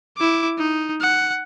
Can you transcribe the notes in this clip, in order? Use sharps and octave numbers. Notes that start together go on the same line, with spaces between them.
E4 D6
D#4
F#5